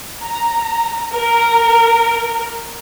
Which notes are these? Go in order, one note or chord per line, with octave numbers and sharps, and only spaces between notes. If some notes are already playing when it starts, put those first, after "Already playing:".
A#5
A#4